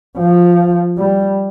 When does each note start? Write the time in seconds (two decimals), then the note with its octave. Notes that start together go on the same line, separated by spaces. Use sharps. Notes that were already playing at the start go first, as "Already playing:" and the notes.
0.18 F3
0.97 G3